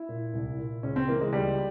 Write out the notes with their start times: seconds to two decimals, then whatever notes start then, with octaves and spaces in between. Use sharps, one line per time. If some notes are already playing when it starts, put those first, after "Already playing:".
Already playing: E4
0.09 A#2
0.33 C2
0.58 A#2
0.83 C#2 C#4
0.96 C4
1.08 C#3 E3 A#3
1.20 G#3
1.33 C#2 G3